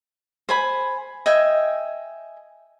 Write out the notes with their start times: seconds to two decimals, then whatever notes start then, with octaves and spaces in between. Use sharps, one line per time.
0.49 C5 G#5 B5
1.26 D#5 E5 G5 G#5